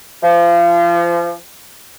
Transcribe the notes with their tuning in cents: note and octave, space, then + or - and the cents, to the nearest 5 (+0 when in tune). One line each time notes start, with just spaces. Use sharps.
F3 -30